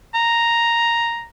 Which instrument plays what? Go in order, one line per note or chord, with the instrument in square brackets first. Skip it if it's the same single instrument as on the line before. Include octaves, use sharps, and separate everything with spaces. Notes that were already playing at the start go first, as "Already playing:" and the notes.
[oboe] A#5